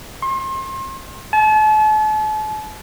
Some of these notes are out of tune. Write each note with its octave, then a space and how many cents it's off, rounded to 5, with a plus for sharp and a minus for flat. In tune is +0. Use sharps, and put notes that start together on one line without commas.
C6 +35
A5 -40